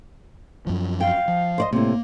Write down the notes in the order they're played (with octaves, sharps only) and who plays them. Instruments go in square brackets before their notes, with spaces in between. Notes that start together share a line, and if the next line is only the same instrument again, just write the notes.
[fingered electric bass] F#2 F3
[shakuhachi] F5 [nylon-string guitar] G5
[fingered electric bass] F3
[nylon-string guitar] C5 D5 D#5
[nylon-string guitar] A2 C3 [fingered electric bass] A#3